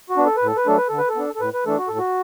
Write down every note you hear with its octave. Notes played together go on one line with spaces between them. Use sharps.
F#4
B3 D4
A4
B4
A2 A4
B4
F#3 A3 D4 A4
B4
D3 A4
B4
A4
B3 D4
A4
A2 B4
B4
E3 A3 D4 A4
F#4
A2 A4
F#4